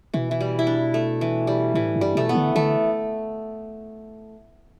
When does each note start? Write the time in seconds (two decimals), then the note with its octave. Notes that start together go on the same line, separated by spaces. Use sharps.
0.14 B2 E3
0.31 E3
0.41 G3
0.59 E4
0.67 D4
0.94 A3
1.21 E3
1.47 G3
1.74 A2 E3
1.96 G2
2.01 G3
2.15 B2 A3
2.29 B3
2.35 D3
2.55 D3 A3